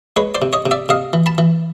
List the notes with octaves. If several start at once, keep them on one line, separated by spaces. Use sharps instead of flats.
G#3 B4 C#5
C5 D5
C3
C#5 D#5
C3
D5 E5
C3 D#5 F5
E3
A5 B5
E3